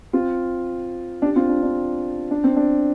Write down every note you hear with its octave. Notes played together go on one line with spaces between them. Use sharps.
C4 F4
D4 G4
C4 F4
D4
D4
D4
C4
D4